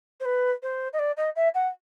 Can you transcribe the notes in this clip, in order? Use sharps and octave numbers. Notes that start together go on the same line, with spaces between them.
C5
B4
C5
D#5
D5
D#5
E5
F#5